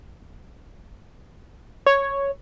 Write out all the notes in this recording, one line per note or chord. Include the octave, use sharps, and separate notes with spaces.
C#5